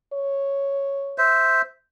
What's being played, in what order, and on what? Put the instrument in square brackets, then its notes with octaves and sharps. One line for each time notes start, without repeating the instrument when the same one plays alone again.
[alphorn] C#5
[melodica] C5 E5